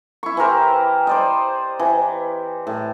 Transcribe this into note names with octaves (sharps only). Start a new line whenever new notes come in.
E4 C#6
E3 G4 A#4 C5
C5 D5 D#5
E3
A2